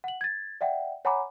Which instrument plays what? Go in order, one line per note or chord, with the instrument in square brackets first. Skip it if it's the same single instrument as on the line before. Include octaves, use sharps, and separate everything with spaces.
[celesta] F#5 F#7
G#6 A6
D5 E5 F#5 G5
C#5 F#5 G#5 A#5 B5 D6